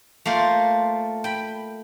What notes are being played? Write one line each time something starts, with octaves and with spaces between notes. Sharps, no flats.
A3 A#3 F4 C5
G5 B5